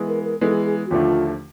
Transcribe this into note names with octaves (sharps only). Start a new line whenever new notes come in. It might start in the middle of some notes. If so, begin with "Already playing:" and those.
Already playing: E3 G#3 B3
A#4
A#4
E3 G#3 B3 A4
G#4
G#4
F#4
D#2 D3 F3 A3 F4